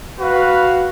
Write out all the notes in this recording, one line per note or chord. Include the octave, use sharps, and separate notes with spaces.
F#4 B4 F5